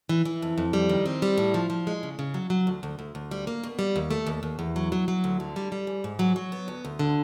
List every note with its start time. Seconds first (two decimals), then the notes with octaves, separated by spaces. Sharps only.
0.09 E3
0.25 E3
0.42 F2
0.58 F2
0.73 G3
0.89 D#3
1.06 C4
1.22 G3
1.38 A2
1.54 F3
1.70 F3
1.87 G#3
2.03 C#3
2.19 C#3
2.34 F#3
2.50 F#3
2.67 D2
2.83 D2
2.99 D2
3.15 D2
3.31 G3
3.47 A#3
3.64 B2
3.79 G3
3.96 D#2
4.11 A3
4.27 D#2
4.43 D#2
4.59 E2
4.76 F#3
4.92 F#3
5.08 F#3
5.24 D2
5.40 D3
5.56 G3
5.72 G3
5.87 G#2
6.04 G#2
6.19 F#3
6.36 F#3
6.52 B3
6.68 D2
6.85 D2
6.99 D3